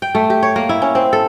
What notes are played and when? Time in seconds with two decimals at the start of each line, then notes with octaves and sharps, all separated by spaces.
0.02 G5
0.15 A3
0.30 G4
0.43 C#5
0.56 A#3
0.69 E4
0.82 C#4
0.95 C4
1.13 A4